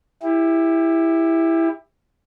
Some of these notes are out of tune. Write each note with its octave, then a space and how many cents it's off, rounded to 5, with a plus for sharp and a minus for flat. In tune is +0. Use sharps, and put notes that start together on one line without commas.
E4 +0 G4 +30